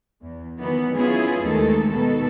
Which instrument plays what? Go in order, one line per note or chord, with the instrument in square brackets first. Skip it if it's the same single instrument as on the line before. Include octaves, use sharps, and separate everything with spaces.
[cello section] E2
D#3 E3 F#3 B3
B3 C#4 E4 F4 G#4
D#2 D#3 G#3 A3 A4
B2 D#3 B3 A4